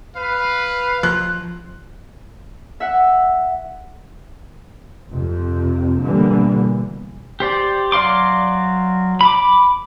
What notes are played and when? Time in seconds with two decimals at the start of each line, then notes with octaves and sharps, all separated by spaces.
0.16 B4 F5
1.03 F3 F#6
2.80 E5 F#5
5.10 F2 C3
6.02 B2 D3 E3 G3 A#3 B3
7.40 G4 C5 D5
7.92 F#3 D5 F5 C6 D6
9.21 B5 D6